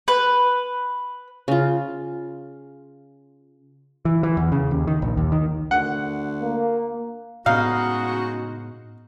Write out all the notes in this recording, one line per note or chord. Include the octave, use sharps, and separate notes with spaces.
B4
C#3 F4
E3
E3
E2
C#3
D#2
D#3
A#1
D#2
D#3
D2 F#5
A#3
A2 C#3 G#3 B3 D#4 F#4 F5